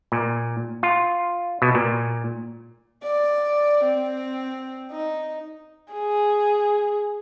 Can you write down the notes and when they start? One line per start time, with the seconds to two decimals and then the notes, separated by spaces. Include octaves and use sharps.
0.12 A#2
0.83 F4
1.62 B2
1.75 A#2
3.03 D5
3.84 C4
4.91 D#4
5.93 G#4